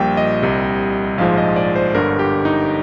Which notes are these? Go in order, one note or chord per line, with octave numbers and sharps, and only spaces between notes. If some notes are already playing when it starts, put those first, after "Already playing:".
Already playing: A#1 A#2 G3 G5
D#5
C2 C3 G3
A#1 G#2 F3 G#3 F5
D#5
D5
C5
G1 G2 D3 A#4
G4
D#4